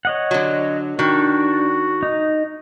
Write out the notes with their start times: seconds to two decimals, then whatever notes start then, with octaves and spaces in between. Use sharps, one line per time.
0.05 C#5 D#5 F#5
0.31 D3 F#3
0.99 D#3 D4 F#4
2.03 D#4